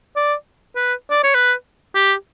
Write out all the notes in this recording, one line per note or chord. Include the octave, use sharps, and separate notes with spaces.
D5
B4
D5
C#5
B4
G4